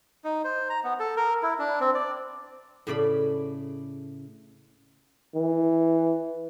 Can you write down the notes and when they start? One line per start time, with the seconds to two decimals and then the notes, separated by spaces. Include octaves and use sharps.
0.24 D#4
0.44 C5
0.70 A#5
0.84 B3
1.00 A4
1.17 A#4
1.43 E4
1.59 D4
1.80 C4
1.95 D5
2.87 A2 C#3 D5 B5
5.35 E3